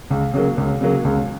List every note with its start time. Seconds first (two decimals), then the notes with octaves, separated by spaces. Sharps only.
0.10 C#2
0.34 C#3 F#3 A#3
0.57 C#2
0.81 C#3 F#3 A#3
1.04 C#2